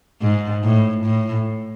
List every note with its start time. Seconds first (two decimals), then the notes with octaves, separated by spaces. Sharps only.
0.22 G#2
0.64 A2
1.05 A2